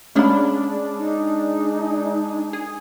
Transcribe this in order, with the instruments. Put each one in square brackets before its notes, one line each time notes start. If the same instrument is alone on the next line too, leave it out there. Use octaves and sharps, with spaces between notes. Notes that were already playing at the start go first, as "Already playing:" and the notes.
[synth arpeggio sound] G#3 D4 G#4 [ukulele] C#4 B5
[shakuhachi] D#4
[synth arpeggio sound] G#4